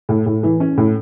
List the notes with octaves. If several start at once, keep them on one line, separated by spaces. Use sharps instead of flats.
A2
A2
E3
C#4
A2